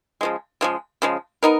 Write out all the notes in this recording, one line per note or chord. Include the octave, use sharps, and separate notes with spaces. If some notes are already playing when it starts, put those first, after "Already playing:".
C#3 F3 G#3
C#3 F3 G#3
C#3 F3 G#3
B3 D#4 A#4